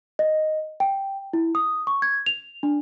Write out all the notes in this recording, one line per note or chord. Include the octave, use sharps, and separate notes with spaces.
D#5
G5
E4
D#6
C#6
G#6
F7
D4